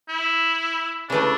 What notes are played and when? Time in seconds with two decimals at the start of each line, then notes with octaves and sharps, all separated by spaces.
0.08 E4
1.09 C#3 E3 A3 D4